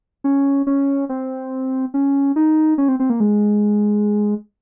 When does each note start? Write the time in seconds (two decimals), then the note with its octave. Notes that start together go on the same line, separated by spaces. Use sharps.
0.24 C#4
0.67 C#4
1.09 C4
1.94 C#4
2.36 D#4
2.78 C#4
2.88 C4
3.00 C4
3.10 A#3
3.20 G#3